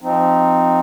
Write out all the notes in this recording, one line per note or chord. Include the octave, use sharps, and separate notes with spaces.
F3 C4 D#4